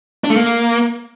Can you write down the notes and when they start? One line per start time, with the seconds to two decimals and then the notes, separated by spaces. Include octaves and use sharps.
0.24 D4
0.30 A3
0.36 A#3